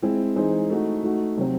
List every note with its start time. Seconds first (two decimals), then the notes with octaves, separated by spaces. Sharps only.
0.02 G#3 C4 E4 G#4
0.36 E3 G#3 D#4 G#4 C5
0.70 A3 D#4 F#4
1.03 A3 D#4 F#4
1.37 C3 F#3 C4